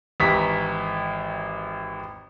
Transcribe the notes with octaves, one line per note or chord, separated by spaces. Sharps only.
G#1 E3 G4 A#5 C#6 B6